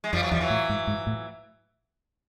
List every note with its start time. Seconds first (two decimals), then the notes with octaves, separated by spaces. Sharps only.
0.04 G#3
0.13 F2 F3 G3
0.22 E3 F#3
0.31 E2 F3 G3
0.41 E3 F#3
0.50 A2
0.69 G#2
0.87 G#2
1.07 A2